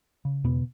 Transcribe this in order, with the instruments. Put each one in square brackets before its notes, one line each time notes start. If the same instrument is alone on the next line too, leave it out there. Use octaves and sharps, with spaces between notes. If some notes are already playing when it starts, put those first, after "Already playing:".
[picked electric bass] C#3
E2 B2 B3